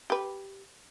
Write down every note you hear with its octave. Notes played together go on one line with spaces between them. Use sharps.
G4 B4